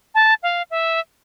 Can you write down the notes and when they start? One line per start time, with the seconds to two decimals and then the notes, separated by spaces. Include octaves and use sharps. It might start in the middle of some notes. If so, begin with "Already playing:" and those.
0.15 A5
0.43 F5
0.71 E5